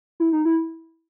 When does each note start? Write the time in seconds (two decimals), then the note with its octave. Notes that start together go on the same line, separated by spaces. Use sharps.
0.20 E4
0.33 D#4
0.45 E4